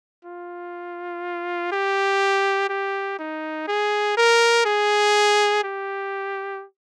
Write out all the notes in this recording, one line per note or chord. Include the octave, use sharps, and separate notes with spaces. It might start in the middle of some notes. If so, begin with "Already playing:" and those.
F4
G4
G4
D#4
G#4
A#4
G#4
G4